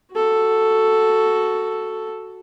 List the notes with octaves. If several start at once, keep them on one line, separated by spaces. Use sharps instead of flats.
F#4 A4